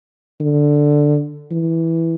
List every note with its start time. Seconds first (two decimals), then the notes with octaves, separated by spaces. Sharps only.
0.40 D3
1.51 E3